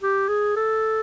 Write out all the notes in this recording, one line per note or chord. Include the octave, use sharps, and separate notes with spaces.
G4
G#4
A4